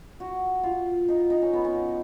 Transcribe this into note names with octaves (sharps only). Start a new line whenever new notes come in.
F#4
F4
D#4
D#4
C#4
B3
C#4